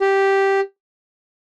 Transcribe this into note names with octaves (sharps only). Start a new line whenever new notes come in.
G4